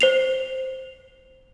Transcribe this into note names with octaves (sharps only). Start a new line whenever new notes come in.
C5 C7 F7